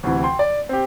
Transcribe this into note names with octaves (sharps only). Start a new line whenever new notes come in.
D2 C3 E3
G5 C6
D5
C4 G4